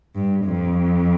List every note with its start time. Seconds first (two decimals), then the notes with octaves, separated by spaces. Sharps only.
0.15 G2
0.45 F2